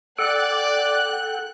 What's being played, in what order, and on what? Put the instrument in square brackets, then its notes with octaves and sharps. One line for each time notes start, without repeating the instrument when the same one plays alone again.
[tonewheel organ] A4 F#5 G5 [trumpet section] D5 [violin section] F#6